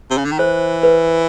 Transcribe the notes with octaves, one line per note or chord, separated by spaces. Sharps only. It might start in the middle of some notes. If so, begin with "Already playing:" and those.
C3
C#3
D3
D#3
E3 C5
B4